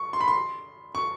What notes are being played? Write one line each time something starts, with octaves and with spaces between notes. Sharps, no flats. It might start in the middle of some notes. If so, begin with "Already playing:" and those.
Already playing: C#6
C6
B5
C6
C#6